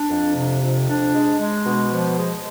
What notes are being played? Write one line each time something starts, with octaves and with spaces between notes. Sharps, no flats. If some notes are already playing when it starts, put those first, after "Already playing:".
Already playing: D4
F2
C3
F2
D4
G#3
G#3
B2
F3
G#3